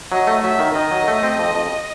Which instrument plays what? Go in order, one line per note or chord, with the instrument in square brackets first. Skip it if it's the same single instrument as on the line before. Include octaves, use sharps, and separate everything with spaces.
[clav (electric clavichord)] F#3 [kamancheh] D#5
[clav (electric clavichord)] A3
[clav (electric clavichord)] F#3 [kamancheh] E5
[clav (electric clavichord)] D#3
[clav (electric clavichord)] D#3 [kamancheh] D#5
[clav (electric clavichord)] F#3
A3
C4
F2
F2